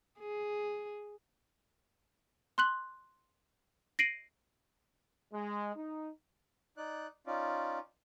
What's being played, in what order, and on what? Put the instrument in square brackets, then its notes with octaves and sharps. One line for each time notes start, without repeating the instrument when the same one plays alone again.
[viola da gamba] G#4
[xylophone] C6 F#6 F#7
A#6 C7 D7 D#7 F#7
[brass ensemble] G#3
D#4
[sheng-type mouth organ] D#4 D5 F#6
C#4 D#4 F4 D5